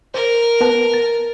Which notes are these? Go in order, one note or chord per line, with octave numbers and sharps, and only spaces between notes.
A#4 C5
B3 B4 A5
A6